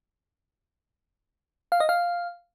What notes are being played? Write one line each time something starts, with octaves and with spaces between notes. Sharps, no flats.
F5
D#5
F5